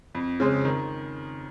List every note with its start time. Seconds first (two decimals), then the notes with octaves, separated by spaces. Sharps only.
0.15 F2
0.40 C#3 G#3 C4
0.65 D#3